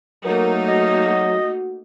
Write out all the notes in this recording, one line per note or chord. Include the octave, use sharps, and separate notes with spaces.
F#3 A3 A#3 D#4 A#4
F#4 D#5